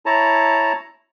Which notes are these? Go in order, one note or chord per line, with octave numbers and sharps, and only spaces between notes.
E4 C#5 A5 A#5